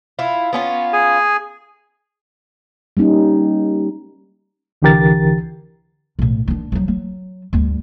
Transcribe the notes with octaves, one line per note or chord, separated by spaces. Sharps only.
E4 F4
B3 C#4 F4
G#4 G#5
G3 A#3 C#4 D#4
C2 D3 E3 G4 A#4 A6
B1 A2
D#3 D4
F3 F#3
F#3
D2 G2